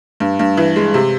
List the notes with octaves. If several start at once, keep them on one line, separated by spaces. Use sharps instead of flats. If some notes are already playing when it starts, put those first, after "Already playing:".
G2
G2
E3
G#3
C3